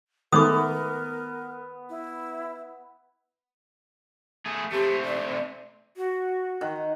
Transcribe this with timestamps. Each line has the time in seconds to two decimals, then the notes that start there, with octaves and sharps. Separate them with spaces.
0.33 D#3 G#3 A3 B3 A#4 D6 D#6
1.90 E4
4.46 A3 G#4
4.72 A3 C4 G4
5.05 D5
5.97 F#4
6.61 D#3 F#5